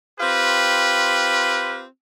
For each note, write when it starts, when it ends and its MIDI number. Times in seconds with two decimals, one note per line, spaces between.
0.19 1.84 60
0.19 1.84 65
0.19 1.84 67
0.19 1.84 71